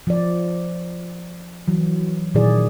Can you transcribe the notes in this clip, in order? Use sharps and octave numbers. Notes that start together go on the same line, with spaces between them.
F3 D5
E3 F#3
A#2 D#3 F#3 E4 G#4 D5